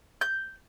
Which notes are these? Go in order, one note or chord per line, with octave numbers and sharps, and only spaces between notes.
G6